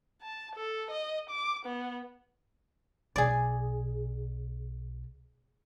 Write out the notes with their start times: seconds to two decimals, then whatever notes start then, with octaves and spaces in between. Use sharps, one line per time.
0.22 A5
0.56 A4
0.91 D#5
1.30 D6
1.66 B3
3.16 B1 G#4 D5